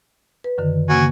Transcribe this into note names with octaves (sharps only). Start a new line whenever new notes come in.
B4
F#2 D3 D#3
C#3 A#3 F#4 G#5